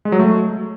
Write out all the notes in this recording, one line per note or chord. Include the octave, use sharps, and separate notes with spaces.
G#3
F#3
A3